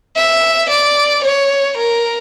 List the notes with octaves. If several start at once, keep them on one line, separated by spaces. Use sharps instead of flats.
E5
D5
C#5
A#4